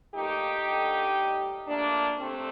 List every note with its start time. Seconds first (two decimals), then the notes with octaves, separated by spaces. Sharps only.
0.14 A#2 F3 A3 D#4 G4
0.65 D3 F3 A3
1.17 A2 G3
1.68 A#2 A3 A#3 D4
2.19 C3 A3 C4